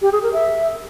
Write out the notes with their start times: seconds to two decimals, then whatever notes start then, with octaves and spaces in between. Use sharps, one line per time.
0.02 G4
0.12 G#4
0.23 A#4
0.33 E5